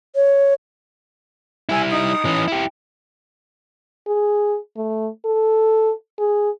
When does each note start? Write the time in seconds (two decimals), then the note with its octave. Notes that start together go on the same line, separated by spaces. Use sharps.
0.16 C#5
1.69 G3 E4 G#5 E6
1.89 D#4 D#6
2.25 E3 C#4
2.48 E4 G4
4.08 G#4
4.76 A3
5.25 A4
6.19 G#4